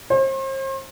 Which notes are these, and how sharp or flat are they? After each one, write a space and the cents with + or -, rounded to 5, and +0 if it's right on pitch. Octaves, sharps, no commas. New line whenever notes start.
C5 +40